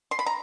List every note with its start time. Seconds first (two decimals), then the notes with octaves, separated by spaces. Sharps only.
0.11 C6
0.19 B5
0.26 A#5